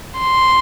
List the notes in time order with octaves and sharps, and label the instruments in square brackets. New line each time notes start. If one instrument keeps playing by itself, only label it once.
[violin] C6